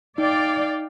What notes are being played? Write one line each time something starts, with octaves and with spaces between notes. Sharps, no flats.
D#4 D5 F5 G5